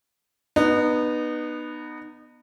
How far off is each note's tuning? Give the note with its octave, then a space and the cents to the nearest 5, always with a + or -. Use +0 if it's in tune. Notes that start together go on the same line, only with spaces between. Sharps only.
B3 -5 D#4 -30